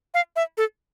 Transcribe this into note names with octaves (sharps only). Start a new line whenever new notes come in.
F5
E5
A4